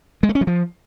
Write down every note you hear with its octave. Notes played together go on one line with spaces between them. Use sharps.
G#3
A3
C#4
F#3
F3